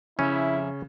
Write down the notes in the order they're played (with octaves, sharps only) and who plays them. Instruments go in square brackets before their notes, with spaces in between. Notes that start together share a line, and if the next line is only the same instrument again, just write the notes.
[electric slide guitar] F2 E5 [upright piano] C#3 [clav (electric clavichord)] C#4 [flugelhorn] E4